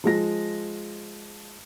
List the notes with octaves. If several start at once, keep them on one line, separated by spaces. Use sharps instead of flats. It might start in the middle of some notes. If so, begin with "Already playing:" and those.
F3 G#3 A#6